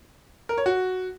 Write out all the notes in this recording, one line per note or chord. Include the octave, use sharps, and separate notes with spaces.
A#4
C#5
F#4